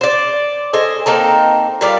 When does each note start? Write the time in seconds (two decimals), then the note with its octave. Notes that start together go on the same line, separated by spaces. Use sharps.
0.01 C5 D5
0.73 A3 C5 D#5 G#5
1.06 A#3 C4 D#4 A4
1.81 A#2 G3 D5 F5